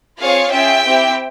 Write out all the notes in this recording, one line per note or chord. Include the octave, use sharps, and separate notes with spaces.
C4 F4 G#4 C#5 F5
C#4 F4 G#4 E5 G5
C4 E4 G4